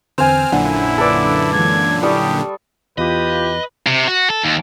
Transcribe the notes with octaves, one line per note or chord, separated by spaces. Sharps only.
E2 D3 C4 C5 G#5 F6
A#1 F#2 A#2 D3 D4 E4 F#5
A4 B4 D5
E3 G#3 G#6
G3 E4 G4 C#6 D#6
E2 F4 G4 B4 D#5
C3
F#4
A4
D#2